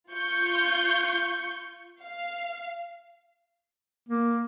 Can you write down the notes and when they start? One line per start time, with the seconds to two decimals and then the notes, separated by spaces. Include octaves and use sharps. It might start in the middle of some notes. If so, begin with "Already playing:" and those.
0.13 F4 C#6 G6
2.03 F5
4.09 A#3